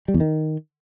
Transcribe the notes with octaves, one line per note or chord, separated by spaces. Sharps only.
G3
E2
D#3